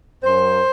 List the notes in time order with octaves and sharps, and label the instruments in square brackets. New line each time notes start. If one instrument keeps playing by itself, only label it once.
[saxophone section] F#2 C5